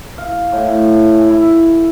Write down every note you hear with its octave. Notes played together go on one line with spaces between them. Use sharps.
F5
A2
G#5
E4